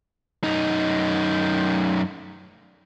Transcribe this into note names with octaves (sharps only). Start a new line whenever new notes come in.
F#2 D#4